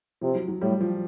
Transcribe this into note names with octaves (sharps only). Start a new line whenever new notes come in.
C3 F3
F#3
F#3
A2 G3
F3